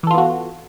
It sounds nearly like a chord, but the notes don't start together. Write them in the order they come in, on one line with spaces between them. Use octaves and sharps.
E3 A4 F4 B3 F#4